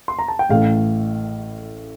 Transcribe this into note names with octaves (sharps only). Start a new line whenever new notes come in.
C6
A#5
A5
G5
A1 A2 E3 A3 F5